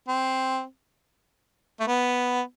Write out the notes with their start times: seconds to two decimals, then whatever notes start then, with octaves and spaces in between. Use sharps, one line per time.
0.08 C4
1.80 A3
1.87 B3